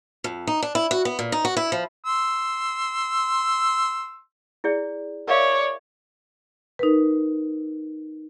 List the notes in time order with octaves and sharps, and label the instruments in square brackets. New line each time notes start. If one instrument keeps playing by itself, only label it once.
[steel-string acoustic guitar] F2
D#4
D4
E4
F#4
B3
A#2
D#4
F#4
E4
F3
[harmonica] C6 E6
[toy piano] E4 G#4 D5
[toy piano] A#4 E5 F5 [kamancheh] C#5 D5
[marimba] D#4 A#4 B4